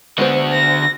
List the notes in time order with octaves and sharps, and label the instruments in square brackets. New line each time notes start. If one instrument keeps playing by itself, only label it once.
[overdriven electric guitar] D3 F#4 [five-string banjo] G#3 B3 C5
[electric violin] A#6